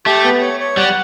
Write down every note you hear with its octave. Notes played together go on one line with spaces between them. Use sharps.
A3 G4
B3
C#5
C#5
G3 F#5